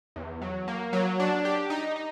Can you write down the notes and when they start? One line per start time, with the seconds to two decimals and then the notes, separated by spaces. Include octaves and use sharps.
0.16 E2
0.42 F#3
0.68 A#3
0.93 F#3
1.20 D4
1.45 G4
1.70 D#4
1.96 D#4